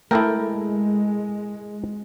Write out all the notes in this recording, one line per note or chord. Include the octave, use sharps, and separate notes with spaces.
G#3 A3 E4 A4 A#4 G5